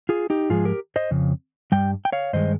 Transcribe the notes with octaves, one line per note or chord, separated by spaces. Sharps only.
F4 G#4
D#4 G4
G#2 F3 G#3 F4 G#4
G4 A#4
C5 D#5
F2 C#3
G2 G3 G5
G5
C#5 F5
G2 D#3 G#3 C5 D#5